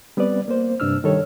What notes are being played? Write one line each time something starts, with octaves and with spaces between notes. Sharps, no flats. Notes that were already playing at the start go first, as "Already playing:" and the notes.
G3 B3 C4 B4 D5
A#3 C5
G2 C3 D4 E6 F6
D#3 G3 A4 C#5